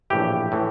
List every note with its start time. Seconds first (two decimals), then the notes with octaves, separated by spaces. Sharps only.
0.10 A#1 A2 E3 G4
0.52 A2 E3